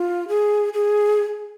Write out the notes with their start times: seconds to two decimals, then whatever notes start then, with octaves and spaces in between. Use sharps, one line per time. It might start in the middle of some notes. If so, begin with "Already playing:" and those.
Already playing: F4
0.28 G#4
0.73 G#4